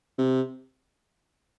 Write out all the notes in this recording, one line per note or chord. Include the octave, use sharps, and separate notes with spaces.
C3